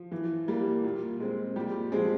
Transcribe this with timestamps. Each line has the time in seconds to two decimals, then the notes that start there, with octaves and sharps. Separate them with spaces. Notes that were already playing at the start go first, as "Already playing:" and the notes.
Already playing: F3
0.12 E3
0.48 G3 A#3
0.84 A#2
1.20 G#3 C4
1.56 A#2 G3 G4
1.92 F3 G#3 C4 G#4